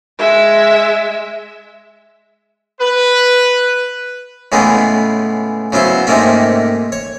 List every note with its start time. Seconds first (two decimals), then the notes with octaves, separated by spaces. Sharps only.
0.19 G#3 E5
2.80 B4
4.52 A2 C#3 E3 G#3 A3 B3
5.72 C#3 F#3 B3 E4 C5
6.07 G#2 C3 D#3 A3 A#3 C#4
6.92 C#5